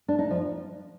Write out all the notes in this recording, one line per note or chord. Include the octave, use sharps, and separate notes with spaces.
D4
D#4
F3